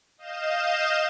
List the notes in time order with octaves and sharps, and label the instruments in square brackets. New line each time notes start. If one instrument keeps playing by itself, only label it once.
[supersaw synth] D#5 F5 G6 E7